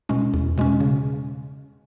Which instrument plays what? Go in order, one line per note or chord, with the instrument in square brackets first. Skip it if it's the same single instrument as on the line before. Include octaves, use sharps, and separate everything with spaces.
[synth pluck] B2 G#3 C#4
E2
B2 G#3 C#4
C#3